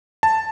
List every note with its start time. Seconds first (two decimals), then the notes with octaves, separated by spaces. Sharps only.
0.23 A5